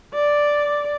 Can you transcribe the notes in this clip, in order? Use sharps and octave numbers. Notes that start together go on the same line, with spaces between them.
D5